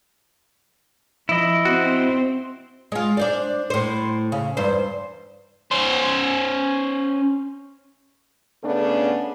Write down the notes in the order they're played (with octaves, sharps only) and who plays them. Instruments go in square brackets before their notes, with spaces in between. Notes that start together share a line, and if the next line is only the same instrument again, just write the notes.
[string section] F3 [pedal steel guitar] E4 D#5
[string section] C4 [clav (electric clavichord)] F#4
[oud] G#3 F4
D4 C5 D5
A2 C5
C#3
E2 G2 C5
[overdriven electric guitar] C#4 C5
[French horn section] C#3 A3 B3 C#4 D4